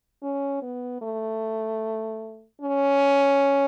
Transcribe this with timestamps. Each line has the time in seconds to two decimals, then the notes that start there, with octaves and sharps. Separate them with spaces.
0.22 C#4
0.62 B3
1.02 A3
2.61 C#4